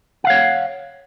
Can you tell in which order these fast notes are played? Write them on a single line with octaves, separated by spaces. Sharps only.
F#5 F5 C#5